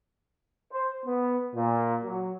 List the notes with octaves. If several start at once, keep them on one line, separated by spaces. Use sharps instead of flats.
C5
B3
A#2
F#3